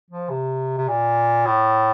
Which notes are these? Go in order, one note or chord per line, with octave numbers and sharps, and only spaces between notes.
F3
C3
C3
A#2
A2